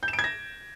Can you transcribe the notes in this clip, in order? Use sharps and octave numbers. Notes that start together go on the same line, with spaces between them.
G6
E7
D7
G#6
A#6